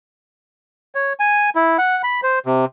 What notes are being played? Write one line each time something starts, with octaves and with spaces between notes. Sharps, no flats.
C#5
G#5
E4
F#5
B5
C5
C3